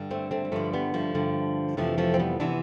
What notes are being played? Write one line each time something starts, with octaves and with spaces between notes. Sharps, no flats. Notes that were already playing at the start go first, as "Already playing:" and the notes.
Already playing: G2 D3
A3 C4
A3 C4
G3
G2 D3 F3 A3
G3 B3
F3 A3
G2 D3
F2 C3 E3 F3 A3
F3 A3
C4
G3 B3
C3 E3 B3 D4